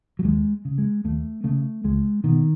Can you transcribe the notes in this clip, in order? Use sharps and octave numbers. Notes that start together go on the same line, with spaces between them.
F#3
D#2 G#3
C#3
G#3
D#2 A3
C#3 A3
C#2 G#3
B2 D#3